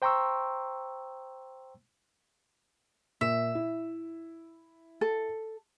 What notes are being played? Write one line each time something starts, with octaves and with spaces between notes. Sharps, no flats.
C5 G5 A#5 C6 C#6 E6
A#2 E5
E4
A4